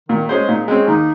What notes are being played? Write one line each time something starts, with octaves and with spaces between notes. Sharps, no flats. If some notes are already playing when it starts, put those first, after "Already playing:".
A#2 D#3
G#3 C#4 G#4 C5
A#2 D#4
G#3 C4 C#4
D#2 D#4